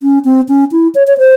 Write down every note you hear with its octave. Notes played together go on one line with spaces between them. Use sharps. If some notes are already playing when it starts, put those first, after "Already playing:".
C#4
C4
C#4
E4
C#5
C#5
C5